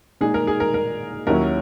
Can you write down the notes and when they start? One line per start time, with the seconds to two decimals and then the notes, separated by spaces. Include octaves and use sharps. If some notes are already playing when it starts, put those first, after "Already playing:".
0.21 A#2 G#3 D#4 G#4
0.34 A#4
0.47 G#4
0.60 A#4
0.74 A#4
1.27 D#2 D#3 F#3 C#4 E4 A#4